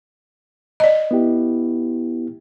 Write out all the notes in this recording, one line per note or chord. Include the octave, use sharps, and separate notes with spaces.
D5 D#5
B3 E4 G4